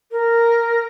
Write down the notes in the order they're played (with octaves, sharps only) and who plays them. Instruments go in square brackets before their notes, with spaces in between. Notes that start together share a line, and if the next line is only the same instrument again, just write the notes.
[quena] A#4